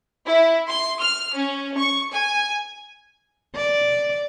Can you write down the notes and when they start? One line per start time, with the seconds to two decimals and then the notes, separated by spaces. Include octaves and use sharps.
0.26 E4
0.68 C6
1.00 F6
1.35 C#4
1.78 C#6
2.13 G#5
3.56 D5